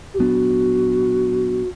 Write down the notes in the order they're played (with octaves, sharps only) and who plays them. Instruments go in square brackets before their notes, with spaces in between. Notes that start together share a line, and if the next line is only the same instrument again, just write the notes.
[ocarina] G4
[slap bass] A#2 F#3 B3 D4 [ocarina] F#4